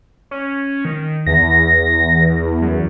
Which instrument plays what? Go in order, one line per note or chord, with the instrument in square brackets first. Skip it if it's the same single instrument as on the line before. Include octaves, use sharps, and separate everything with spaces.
[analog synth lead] C#4
D#3
[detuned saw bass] E2 [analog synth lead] A#6
[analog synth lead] F#2